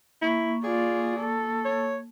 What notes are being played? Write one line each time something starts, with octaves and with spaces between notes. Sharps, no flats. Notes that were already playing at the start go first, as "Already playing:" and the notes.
A#3 E4 C#6
F4 G#4 D5
A4
C#5